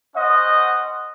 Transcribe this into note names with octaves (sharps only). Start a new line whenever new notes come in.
C#4 C5 D#5 F#5